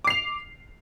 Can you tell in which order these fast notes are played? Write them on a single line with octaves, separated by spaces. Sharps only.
D6 C7 F7